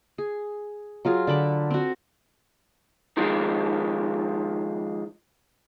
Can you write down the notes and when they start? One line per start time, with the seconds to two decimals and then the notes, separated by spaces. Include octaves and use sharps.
0.18 G#4
1.05 F#3 F4 G#4
1.27 D3 A5 B5 D6
1.70 C4 F#4
3.17 D#3 F3 G#3